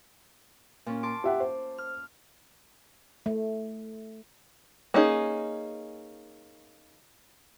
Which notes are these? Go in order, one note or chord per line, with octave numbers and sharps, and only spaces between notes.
A#2 C#4
A5 C6 D6
G4 E5 F#5
C5
F6
A3
A#3 C#4 D#4 G#4